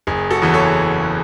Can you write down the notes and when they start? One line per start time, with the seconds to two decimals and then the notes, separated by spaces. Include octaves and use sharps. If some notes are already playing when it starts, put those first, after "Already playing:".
0.07 F#1 G#4
0.30 F#4 A4
0.42 E2 C#3 E3
0.54 A4 C#5